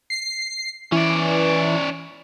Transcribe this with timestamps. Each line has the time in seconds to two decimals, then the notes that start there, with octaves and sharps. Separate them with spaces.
0.10 C7
0.92 E3 C#4 D5